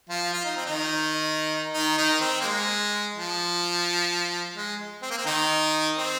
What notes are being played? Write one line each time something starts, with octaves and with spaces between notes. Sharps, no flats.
F3 F4
F4
D#4
C4
D#3 D#4
D#3 D#4
D#3 D#4
C4
A#3
G#3
F3
G#3
C4
A#3
C4
D#3 D#4
C4